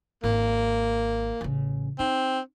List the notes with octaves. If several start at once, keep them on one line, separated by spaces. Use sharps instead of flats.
G#1 A#3
A1 C#3
C4 D#4